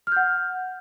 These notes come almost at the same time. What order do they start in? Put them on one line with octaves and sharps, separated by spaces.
F6 G6 F#5